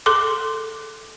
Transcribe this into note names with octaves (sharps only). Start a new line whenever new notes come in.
G#4 A4 C6 D6